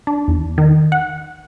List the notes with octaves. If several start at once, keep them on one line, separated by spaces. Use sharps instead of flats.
D4
E2
D#3
F#5